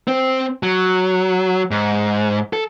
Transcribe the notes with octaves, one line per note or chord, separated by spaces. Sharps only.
C4
F#3
G#2
A4